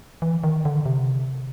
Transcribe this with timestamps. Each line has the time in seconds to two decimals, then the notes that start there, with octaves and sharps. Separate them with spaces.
0.22 E3
0.44 D#3
0.65 D3
0.86 C3